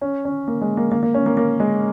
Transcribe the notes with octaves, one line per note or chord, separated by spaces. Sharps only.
C#4
C#4
A#3
G#3
A#3
A#3
A#3
C#4
A#3
A#3
G#3